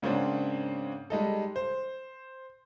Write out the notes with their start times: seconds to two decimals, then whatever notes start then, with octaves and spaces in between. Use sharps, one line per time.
0.02 G#2 C#3 A#3 C4 D4
1.10 G3 G#3 D#4 A4
1.56 C5